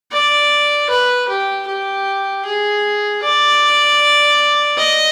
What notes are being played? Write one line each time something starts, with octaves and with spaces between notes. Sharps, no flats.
D5
B4
G4
G4
G#4
D5
D#5